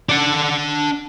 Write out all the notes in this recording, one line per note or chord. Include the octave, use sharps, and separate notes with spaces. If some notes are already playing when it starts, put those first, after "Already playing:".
D4 F#5